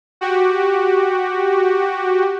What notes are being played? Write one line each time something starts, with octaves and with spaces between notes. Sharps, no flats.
F#4 G4